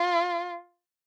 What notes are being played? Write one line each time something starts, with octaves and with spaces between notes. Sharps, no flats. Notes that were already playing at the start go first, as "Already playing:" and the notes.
Already playing: F4